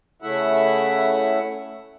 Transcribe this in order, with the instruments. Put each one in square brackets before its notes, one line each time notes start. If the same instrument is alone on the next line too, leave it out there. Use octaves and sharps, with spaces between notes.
[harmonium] C#3 A3 E4 E5 F#5